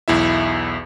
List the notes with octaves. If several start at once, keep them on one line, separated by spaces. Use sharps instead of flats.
B1 E2 E4 E5